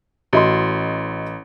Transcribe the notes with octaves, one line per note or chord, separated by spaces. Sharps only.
A1 F#4 D#5 C6